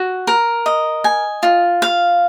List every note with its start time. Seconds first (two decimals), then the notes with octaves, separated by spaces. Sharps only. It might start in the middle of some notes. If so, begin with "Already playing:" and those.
Already playing: F#4
0.27 A#4
0.66 D#5
1.04 G#5
1.43 F4
1.82 F5